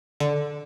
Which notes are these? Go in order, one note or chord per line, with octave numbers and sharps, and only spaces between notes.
D3